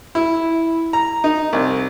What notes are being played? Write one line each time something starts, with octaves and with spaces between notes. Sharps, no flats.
E4
A#5
D#4
C2